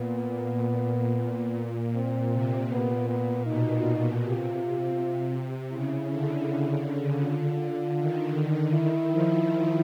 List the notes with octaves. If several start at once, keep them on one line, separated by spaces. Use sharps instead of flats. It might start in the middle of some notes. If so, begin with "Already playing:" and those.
Already playing: A#2 B3
A#2
A#2 C4
C3
A#2 B3
B3
B2 D#4
C3 F4
C#3 E4
D3
D3
D3 F4
D#3
D#3 E4
F3